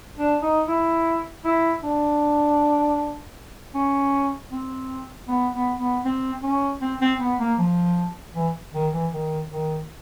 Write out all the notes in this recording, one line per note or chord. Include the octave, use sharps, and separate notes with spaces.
D4
D#4
E4
E4
D4
C#4
C4
B3
B3
B3
C4
C#4
C4
C4
B3
A#3
F3
E3
D#3
E3
D#3
D#3